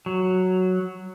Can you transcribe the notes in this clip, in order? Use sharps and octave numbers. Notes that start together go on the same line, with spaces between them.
F#3